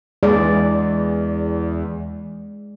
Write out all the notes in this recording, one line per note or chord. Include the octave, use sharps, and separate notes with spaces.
E2 G#3 G#4 D5